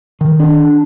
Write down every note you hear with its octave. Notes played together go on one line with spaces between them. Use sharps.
D#3
D4